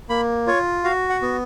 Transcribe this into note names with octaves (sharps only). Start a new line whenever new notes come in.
A#3 B5
F4 C#5
F#4 F5
F#5
B3